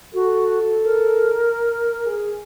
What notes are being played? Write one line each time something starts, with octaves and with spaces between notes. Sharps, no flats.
F#4 A4
A#4
G#4